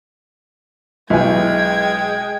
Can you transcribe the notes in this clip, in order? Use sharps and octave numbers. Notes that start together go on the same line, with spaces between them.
B1 G#3 E4 G5 G#5 G#6